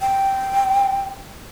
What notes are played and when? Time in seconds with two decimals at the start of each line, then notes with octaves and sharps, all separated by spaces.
0.01 G5